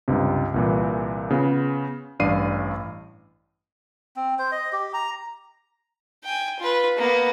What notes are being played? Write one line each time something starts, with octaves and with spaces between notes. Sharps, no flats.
C#2 G2 C3
C2 A#2 E3
C#3 B3 F4
A1 G2 D5 F5 C7 D#7
C4
C5
D#5
G4
A#5
G5 G#5
F4 B4
A#3 B3